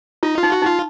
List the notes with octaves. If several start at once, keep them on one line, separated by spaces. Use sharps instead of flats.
D#4 F4
F4
D#4
F#4
D#4 F4